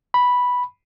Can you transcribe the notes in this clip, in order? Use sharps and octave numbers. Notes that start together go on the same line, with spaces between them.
B5